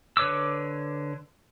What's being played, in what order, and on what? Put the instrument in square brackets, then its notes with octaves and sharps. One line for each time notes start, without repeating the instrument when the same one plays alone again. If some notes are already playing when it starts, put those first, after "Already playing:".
[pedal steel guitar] D3 B4 C#5 D6 E6